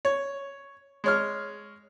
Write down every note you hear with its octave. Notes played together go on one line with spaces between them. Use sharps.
C#5
G#3 C#5 F6